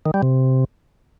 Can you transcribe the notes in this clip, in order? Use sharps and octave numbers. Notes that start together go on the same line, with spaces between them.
D#3
G3
C3